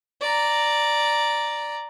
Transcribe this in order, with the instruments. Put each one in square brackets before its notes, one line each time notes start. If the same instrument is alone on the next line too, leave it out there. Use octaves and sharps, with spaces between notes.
[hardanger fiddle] D5 A#5